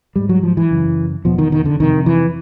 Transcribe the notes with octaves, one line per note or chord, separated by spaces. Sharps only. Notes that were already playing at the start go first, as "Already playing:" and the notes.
G#2 G3
F#3
F3
E3
F#2 C#3
E2 B2 F3
D#3
D#3
D3
F2 C3 D#3
E3